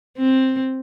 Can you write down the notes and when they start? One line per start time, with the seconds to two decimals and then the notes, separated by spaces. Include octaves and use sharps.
0.18 C4